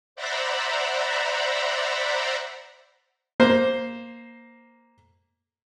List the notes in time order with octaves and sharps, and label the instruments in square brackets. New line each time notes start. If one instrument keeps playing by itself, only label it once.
[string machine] C5 D5 E5 F#5 A#5 B5
[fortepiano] A#3 C5